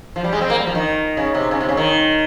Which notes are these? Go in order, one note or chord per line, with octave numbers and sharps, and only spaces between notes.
F3
G3
G#3
C4
A#3
G3
F3
D#3
C#3
C3
C#3
C3
C#3
D#3